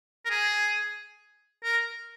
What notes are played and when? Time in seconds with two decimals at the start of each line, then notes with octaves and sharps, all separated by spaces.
0.25 A#4
0.30 G#4
1.64 A#4